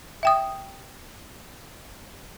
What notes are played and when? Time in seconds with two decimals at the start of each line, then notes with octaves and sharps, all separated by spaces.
0.23 E5 G5 D#6